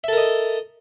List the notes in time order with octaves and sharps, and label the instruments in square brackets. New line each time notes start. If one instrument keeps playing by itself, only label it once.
[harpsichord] E5
A4
A#4
D#5